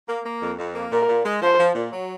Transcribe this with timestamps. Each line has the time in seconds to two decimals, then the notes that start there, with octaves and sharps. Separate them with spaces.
0.09 A#3
0.25 A#3
0.42 F2
0.58 F2
0.75 A#3
0.92 A#2 A#4
1.09 A#2
1.25 G#3
1.42 F3 C5
1.59 F3
1.75 A#2
1.92 F#3